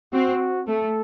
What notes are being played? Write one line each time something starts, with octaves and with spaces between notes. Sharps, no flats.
C4 F#4
A3 A4